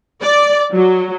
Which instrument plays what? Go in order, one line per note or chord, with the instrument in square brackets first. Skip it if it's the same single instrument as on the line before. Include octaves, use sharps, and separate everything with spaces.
[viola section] D5
F#3